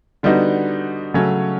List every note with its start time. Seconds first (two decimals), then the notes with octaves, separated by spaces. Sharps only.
0.23 D3 G3 B3 D#4 F#4
1.14 C#3 F#3 A3 C#4 F#4